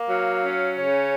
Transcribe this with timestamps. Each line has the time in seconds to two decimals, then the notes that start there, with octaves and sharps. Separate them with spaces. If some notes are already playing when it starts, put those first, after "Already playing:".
Already playing: A#3
0.09 F#3 F5
0.43 C#4
0.77 C#3 C#5